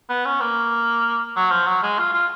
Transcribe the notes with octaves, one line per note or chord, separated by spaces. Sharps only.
B3
C#4
A#3
F#3
F3
F#3
G#3
F4
F4